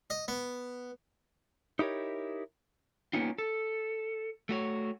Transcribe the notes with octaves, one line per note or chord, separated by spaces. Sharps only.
D#5
B3
D#4 E4 G4 A#4 C#5
A#3 B3 C#4 D#4 F4
A4
A3 F#4 C#5